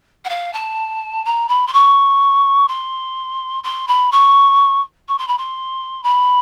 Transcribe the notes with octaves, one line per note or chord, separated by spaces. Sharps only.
F#5
F5
A5
A#5
B5
C6
C#6
C6
C6
B5
C#6
C#6
C6
B5
C6
B5